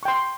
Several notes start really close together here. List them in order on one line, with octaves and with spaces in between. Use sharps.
C#6 G5 C6